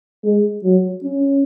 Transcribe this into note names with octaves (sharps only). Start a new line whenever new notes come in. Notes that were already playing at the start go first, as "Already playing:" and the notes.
G#3
F#3
C#4